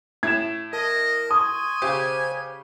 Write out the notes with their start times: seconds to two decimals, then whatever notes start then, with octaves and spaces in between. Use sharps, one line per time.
0.23 A2 G#6 E7
0.73 A#4 D#5 A5
1.31 G#5 C6 C#6 D#6
1.82 C#3 G4 C5